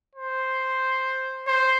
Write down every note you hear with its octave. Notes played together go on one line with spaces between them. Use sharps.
C5
C5